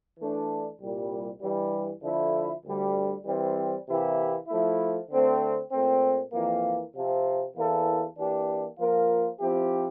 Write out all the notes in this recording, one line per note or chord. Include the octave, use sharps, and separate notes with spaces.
E3 A3 D4
C2 A#2 G3
G2 E3 G3
D3 F3 A3 E4
D2 D3 G3
E3 G3 C4
C3 E3 A#3 E4 G4
F3 A3 E4
D3 A3 C4
A#2 A3 C4
F2 E3 A#3
C3 F3 C4
E2 E3 A#3 E4 A4
E3 A#3 D4 G4
F3 A#3 F4 A#4
F3 C4 E4 G4